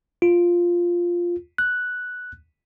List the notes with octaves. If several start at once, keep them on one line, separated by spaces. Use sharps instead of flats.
F4
F#6